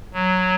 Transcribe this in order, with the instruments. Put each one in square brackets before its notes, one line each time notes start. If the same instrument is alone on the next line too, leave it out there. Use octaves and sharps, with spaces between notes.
[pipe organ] F#3